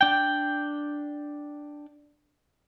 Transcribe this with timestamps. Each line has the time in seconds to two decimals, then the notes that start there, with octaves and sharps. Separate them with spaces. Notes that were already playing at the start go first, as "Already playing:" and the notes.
0.01 D4 G5